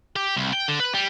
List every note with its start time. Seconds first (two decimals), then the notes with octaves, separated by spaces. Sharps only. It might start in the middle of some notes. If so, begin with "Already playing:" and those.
0.16 G4
0.36 C2
0.53 G5
0.68 D3
0.80 B4
0.95 G3